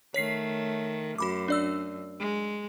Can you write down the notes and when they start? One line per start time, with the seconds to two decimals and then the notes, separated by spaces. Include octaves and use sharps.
0.14 D#3 A3 C#5 B6 C7
1.18 F#2 F#4 B5 D6
1.48 D4 D5 E6
2.19 G#3